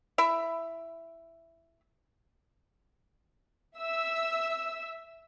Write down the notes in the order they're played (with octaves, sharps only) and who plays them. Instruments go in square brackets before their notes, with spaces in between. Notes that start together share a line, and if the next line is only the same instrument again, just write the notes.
[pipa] E4 E5
[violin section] E5 E6